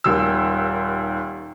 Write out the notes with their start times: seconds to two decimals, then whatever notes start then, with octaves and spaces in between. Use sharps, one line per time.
0.04 D#1 D#2 E6